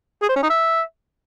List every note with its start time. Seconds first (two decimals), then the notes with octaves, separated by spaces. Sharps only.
0.22 G#4
0.29 C5
0.36 C#4
0.43 D#4
0.50 E5